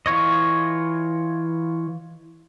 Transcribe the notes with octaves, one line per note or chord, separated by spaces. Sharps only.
E3 F4 C#5 D#5